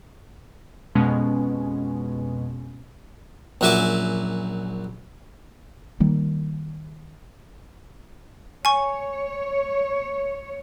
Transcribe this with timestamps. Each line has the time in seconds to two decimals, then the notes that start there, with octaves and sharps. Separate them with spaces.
0.95 F2 B2 G#3 B3 C#4
3.61 A#1 F#2 F#4 E5 G#5 D6
6.00 D#3 G3 A#3
8.65 C#5 G#5 C#6